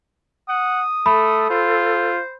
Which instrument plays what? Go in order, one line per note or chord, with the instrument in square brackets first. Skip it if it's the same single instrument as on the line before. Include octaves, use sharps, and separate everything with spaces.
[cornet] F#5 [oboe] D#6
[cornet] A3 [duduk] A4 [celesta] B5
[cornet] F4 [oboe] C5